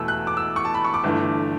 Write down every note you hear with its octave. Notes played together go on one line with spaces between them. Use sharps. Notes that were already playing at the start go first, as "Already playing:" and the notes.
Already playing: E2 B2 A3 E6
F#6
D6
E6
C#6
A5
B5
C#6
D6
G1 G2 E3 A3